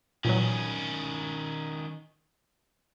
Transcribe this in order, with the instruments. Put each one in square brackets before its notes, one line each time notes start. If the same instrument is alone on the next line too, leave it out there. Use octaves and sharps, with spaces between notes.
[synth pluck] A#2 E3 F#3 [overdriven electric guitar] D#3 C#4